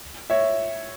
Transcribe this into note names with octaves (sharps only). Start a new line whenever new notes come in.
C#5 E5